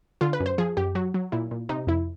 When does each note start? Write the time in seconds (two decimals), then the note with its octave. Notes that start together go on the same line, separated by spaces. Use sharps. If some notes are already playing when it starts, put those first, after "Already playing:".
0.21 D3 F4
0.33 B4
0.40 F#2
0.46 C5
0.58 F3 G#4
0.77 F#2 G4
0.95 F#3 F#4
1.14 F#3
1.32 A#2 E4
1.51 A#2
1.69 C3 D#4
1.87 F2 E4